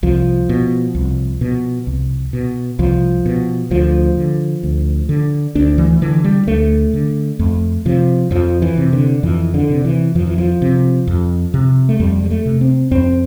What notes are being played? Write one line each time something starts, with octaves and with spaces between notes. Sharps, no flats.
C2 F3
B2
C2
B2
C2
B2
C2 F3
B2
D2 F3
D3
D2
D3
D2 D4
E3
D3 E3
G3
D2 A3
D3
F2 A3
C3 F3
F2 F3
E3
C3
D3
F2 E3
D3
C3
E3
F2 F3
E3
F3
C3
F2
C3
A3
F2 G3
G3
A3
C3
C4
F2 C4